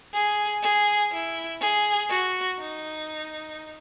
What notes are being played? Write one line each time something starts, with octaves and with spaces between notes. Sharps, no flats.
G#4
G#4
E4
G#4
F#4
D#4